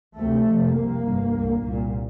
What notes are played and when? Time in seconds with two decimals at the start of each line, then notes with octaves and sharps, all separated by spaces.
0.17 D2 C3 A3
0.47 F1 F2 C3
0.75 C2 C3 A#3
1.04 G1 G2
1.33 C2 A#2
1.62 C2 A#2